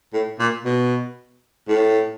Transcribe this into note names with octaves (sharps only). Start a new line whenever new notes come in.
A2
A#2
B2
A2